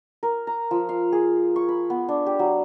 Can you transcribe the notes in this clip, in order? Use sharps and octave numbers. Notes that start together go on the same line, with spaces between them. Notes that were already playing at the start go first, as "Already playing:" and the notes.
A#4
A#5
F3
F5
G#4
C#6
B5
B3
D4
G4
F#3